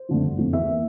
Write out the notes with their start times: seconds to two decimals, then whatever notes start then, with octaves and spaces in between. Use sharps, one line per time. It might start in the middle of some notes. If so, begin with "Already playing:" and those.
Already playing: C5
0.09 F2 D3 A3
0.23 G1
0.38 F2 D3 A3
0.53 E2 E5
0.68 E3 A#3